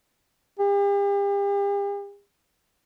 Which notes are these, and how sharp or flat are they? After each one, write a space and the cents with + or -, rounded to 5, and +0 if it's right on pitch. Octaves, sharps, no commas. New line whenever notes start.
G4 +40